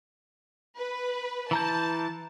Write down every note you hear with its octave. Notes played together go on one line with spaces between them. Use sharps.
B4
E3 A5 A#5 G6